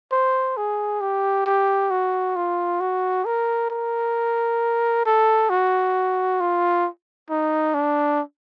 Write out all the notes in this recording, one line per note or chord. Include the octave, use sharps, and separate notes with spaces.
C5
G#4
G4
G4
F#4
F4
F#4
A#4
A#4
A4
F#4
F4
D#4
D4